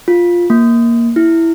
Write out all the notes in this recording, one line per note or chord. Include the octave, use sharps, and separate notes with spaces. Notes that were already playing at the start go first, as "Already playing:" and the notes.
F4
A#3
E4